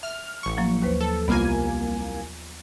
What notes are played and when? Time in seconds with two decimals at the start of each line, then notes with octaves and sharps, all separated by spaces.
0.03 E5 F6
0.43 A1 C#6
0.57 F3 F#3 A#3
0.82 D#2 B4 C5
1.01 A4
1.28 C2 A#3 B3 F4 G#5